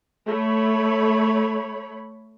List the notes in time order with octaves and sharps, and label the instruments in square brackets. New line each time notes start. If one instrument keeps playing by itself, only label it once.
[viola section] A3 C#5 B5